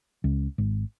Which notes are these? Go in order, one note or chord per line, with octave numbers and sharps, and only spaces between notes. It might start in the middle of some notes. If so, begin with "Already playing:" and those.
C#2
G#1